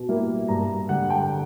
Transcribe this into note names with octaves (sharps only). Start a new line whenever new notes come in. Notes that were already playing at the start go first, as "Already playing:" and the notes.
Already playing: B2
G3 A#3 E4
G2 A#5
D3 G3 F#5
G5